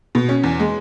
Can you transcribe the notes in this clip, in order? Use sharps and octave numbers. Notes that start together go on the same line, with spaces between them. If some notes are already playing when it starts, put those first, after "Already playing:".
B2
C#4
E2
G#3